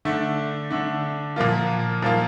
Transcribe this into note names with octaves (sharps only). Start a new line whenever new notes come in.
D3 A3 D4
D3 A3 D4
A#2 F3 A#3 F4
A#2 F3 A#3 F4